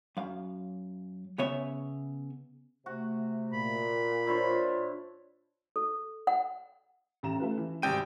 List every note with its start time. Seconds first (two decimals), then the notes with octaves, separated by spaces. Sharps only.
0.17 F#2 F5
1.38 C#3 B3 C#5 E5
2.86 C3 A3 F#4
3.53 A#2 B5
4.27 D4 E4 F4 C5 C#5
5.76 A4
6.27 F#5
7.23 A1 A#5 E7
7.40 A3 F4 B4
7.57 E3
7.82 G#1 G2 C3 G5 D#7